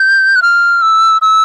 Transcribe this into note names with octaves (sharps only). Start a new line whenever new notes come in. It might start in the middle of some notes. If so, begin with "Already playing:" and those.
Already playing: G6
F#6
F6
E6
E6